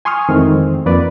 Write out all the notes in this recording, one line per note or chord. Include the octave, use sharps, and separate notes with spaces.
G#5 C6 C#6 D#6 F6
F2 D#3 E3 G#3 A3 C4
F2 A#3 B4 D5